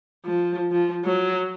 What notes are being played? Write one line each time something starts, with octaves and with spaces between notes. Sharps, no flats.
F3
F3
F#3